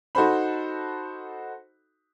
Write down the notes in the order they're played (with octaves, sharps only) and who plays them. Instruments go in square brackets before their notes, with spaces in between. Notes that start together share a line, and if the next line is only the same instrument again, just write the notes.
[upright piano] D#4 F#4 A4 C5 B5